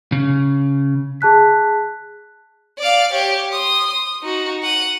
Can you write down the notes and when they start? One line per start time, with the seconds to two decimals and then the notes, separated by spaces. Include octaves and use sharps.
0.12 C#3
1.21 G#4 A5 F#6 B6
2.78 D5 F5
3.12 G4 C#5
3.52 C6 D#6
3.90 D#6
4.23 D#4 F#4
4.63 F#5 D#7